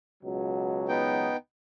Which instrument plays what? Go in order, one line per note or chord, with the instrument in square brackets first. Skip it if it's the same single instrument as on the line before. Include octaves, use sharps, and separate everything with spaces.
[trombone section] C#2 B2 F#3
[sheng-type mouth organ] B3 D#4 G5